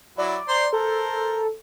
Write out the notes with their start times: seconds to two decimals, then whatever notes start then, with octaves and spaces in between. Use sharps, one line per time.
0.18 F#3 E4 D5
0.48 C5 A#5 C6
0.73 A4 A#4 C5